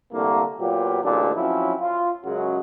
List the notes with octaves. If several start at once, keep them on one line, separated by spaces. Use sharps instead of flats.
C2 D3 A3 A#3
A#2 F#3 B3 F4 G4
A1 D2 A#2 G#3 D4
F3 F#3 C4 C#4 E4
F4
F#2 C#3 F#3 G#3 F#4